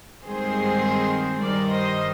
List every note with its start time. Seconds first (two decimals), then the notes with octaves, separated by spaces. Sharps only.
0.25 G2 D#3 G#3 C4 G#4 C5
1.42 G2 D#3 G3 A#4 D5
1.70 C5 D#5